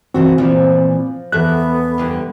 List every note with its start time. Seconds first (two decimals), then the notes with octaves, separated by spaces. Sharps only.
0.14 C#3 E3 C4 F#4
0.38 A#2 E3 F3
1.32 E2 B3 A4 E5 F#6
1.98 D3 E3 G3